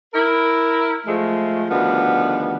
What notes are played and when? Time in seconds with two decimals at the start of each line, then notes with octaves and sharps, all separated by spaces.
0.14 E4 A#4
1.06 F3 G#3 A3
1.69 D2 D#3 F3 G3 B3